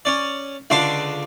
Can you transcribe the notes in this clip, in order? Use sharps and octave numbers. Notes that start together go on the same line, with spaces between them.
C#4 D5
C#2 D3 D4 C6 D6